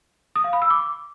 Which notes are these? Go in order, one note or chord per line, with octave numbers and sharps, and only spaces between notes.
D#6
F5
B5
E6
D6